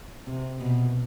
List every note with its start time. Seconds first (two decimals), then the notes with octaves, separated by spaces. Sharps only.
0.27 C3
0.61 B2